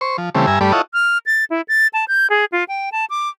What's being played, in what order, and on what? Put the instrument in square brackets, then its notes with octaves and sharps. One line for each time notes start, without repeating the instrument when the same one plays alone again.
[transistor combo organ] C5 C#6
F3
C#3 E3 G3 A3 C4
G2 E5 G#5 A#5
G2 G3 A3 D5 B5
E4 F4 A4 C#5 D#5 F#5
[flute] F6
A6
E4
A6
A5
G6
G#4
F4
G5
A5
D6